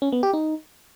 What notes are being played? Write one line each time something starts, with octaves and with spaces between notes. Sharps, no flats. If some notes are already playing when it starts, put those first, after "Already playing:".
C#4
B3
G4
D#4